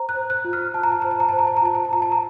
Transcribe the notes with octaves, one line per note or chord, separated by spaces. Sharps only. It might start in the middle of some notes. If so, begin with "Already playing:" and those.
Already playing: C5 A#5
F#6
C5
F#6
F4
F6
F4 A5
A#5
A5
C5 A#5
A5
A#5
C5 A5
A#5
A5
A#5
F4 A5
A#5
A5
F4 A#5
A5
A#5